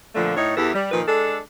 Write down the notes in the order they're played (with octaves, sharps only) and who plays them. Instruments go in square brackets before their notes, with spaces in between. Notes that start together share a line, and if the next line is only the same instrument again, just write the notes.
[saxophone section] A#2 D3 F3 A3
A2 D#4 C#5
E2 E3 G4 A4
G3
A#2 D#3 F3 B4
G#3 D4 A4